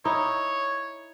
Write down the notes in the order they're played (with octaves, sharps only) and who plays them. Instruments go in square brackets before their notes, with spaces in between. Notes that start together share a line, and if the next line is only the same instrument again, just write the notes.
[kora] D#4 E4 [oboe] C#5